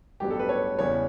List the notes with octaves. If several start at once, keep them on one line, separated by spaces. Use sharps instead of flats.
A1 G2 F#3 B3 G4
A4
B4
C#5
E2 C#3 G3 B3 C#5